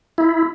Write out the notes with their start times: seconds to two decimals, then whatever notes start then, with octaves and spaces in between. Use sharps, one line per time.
0.18 E4